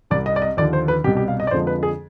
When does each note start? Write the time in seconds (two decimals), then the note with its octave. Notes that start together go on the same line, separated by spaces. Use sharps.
0.10 C2 C3 G3 D5
0.26 D#5
0.36 D5
0.42 D#5
0.57 D#2 D3 F3 D5
0.73 C5
0.88 B4
1.04 C2 B2 G3 G4
1.17 G4
1.28 F5
1.40 D#5
1.47 D5
1.51 F2 D3 F3 G#3 C5
1.67 B4
1.83 G#4